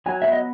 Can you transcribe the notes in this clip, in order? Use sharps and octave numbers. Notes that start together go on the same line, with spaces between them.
F#3 G#5
B3 E5
D#5